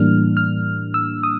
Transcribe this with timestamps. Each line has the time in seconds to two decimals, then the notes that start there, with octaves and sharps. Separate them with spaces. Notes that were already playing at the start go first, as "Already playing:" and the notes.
Already playing: A2 E3 G3 A#3 D4 F6
0.37 F6
0.94 E6
1.23 D#6